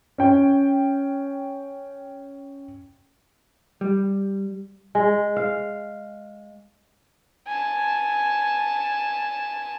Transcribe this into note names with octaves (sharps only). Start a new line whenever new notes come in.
C#4 G5
G3
G#3
F5
G#5 A5